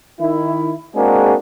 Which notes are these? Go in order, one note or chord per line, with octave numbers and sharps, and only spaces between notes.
D#3 E4
G#3 A#3 C4 D4 F#4 G#4